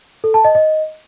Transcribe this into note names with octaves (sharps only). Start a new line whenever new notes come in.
A4
A5
D#5
D#5